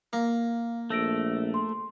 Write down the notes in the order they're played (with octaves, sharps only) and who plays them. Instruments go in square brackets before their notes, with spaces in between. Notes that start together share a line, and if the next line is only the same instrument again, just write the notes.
[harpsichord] A#3 [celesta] F5
[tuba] A#1 [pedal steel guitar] A3 [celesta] E6 A#6 D7
[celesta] C6